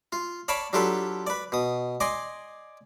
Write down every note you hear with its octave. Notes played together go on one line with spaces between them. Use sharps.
F4
C#5 D5 F5 A5 B5 D6
F#3 D4 F4 G4 A4 B4
B4 D5
B2 D#6
D5 D#5 G#5 C6 D6